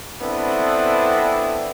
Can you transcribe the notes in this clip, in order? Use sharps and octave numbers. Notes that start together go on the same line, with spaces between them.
B3 C4 D4 E4 A4